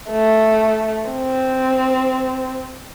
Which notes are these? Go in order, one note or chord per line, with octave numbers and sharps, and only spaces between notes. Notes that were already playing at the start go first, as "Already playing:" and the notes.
A3
C4